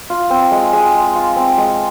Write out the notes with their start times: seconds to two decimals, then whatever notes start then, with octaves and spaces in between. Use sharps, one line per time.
0.10 F4
0.30 C4
0.51 G#3
0.73 G#3
0.94 G#3
1.15 F4
1.36 C4
1.58 G#3